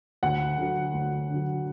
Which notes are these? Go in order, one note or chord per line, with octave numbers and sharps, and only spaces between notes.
D2 F#5
D3 F#3
D2
D3 F#3